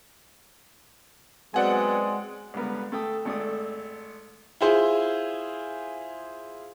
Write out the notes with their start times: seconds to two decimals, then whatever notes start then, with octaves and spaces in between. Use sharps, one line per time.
1.54 F#3 G#3 B3 C4 D5 F#5 G#5
2.54 C#2 D3 G3 B3 A#4
2.92 A3 A4 G5 D#6
3.25 G#1 A3 A4 D5 D#6
4.61 E4 F4 G#4 C5